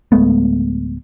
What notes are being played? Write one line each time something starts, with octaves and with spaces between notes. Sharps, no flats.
D1 G#3 A3 B3